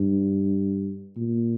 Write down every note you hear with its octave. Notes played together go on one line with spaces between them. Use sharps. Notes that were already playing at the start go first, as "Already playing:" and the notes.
Already playing: G2
A#2